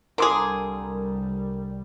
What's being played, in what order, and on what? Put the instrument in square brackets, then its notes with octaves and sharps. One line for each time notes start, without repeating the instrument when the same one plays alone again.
[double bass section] C2 G3 [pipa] D3 G#4 [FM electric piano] A#4 [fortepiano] C6 D6 D#6